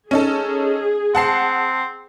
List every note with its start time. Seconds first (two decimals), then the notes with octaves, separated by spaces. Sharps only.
0.11 C#4 D#4 G#4 A4
1.15 C4 F#5 A5 C7